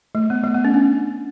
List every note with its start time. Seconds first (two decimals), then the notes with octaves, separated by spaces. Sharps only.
0.15 A3
0.30 B3
0.44 A3
0.54 B3
0.65 C#4
0.74 D4